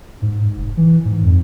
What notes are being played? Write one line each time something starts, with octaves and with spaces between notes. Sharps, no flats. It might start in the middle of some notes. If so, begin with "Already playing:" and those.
G#2
F1
E3
G#2
F2